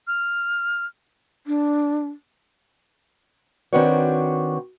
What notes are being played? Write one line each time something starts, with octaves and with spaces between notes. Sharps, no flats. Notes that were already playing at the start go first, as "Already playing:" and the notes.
F6
D4
D#3 C4 D4 F#4 B4 C#5